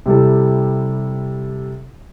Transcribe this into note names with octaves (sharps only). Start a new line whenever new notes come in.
C3 G3 E4 A4